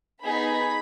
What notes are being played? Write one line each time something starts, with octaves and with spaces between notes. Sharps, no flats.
B3 D#4 G#4 B5